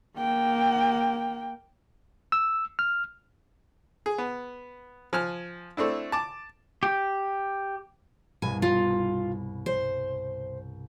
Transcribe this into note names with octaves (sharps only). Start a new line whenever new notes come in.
A#3 G5
E6
F6
G#4
B3
F3 G#5 F6
A3 C4 D4 E4
A5 D6
G4
C2 G2 B2 G#5
F4
C5